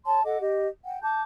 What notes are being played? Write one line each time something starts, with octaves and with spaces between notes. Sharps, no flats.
C#5 A5 C6
A4 D#5 F#5 D6
G4 D#5
F#5 G5
A5 D6 G6